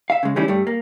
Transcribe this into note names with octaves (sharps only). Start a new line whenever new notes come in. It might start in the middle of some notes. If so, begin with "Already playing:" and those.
E5 F5
C#3 G#3
D#3 E3 G3 A3 C#4 E4
G2 G3 A3
A#3